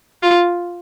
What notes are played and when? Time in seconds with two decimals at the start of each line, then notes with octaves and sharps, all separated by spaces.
0.23 F4